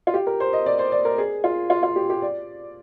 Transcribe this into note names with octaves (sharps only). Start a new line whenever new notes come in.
F4
G4
A#4
C5
D#5
D5
C5
D5
A#4
G#4
F4
F4
F4
G4
G4
D5